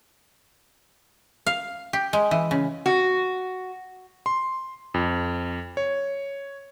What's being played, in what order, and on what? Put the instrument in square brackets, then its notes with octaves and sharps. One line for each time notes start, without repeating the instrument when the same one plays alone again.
[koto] F5
G4
G#3
E3
C#3
[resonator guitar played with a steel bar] F#4
[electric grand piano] C6
F2
C#5